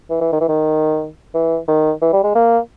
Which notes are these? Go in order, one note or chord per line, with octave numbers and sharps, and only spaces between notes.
E3
E3
D#3
E3
D#3
E3
D#3
E3
G3
G#3
A#3